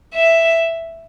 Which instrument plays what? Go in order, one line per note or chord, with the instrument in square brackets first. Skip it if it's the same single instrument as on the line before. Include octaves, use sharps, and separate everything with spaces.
[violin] E5